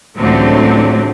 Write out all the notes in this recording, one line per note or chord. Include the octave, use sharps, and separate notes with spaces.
C#2 A2 D3 E3 F#3 C4